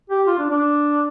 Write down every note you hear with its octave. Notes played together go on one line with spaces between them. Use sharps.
G4
F4
D4
D4